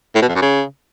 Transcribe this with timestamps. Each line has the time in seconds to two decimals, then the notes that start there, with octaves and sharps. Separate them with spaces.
0.15 A2
0.22 B2
0.29 F2
0.35 F#2
0.42 C#3